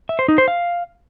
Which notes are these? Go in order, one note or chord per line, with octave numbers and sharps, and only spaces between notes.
E5
C5
D#4
C5
F5